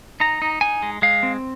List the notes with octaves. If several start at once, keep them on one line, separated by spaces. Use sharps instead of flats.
D#4 A#5
D#4
D#4 G#5
G#3
G#3 F5
C4